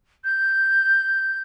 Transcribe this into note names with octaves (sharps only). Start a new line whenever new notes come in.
G6